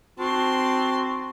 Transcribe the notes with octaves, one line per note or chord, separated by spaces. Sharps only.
C4 F#4 A5 C6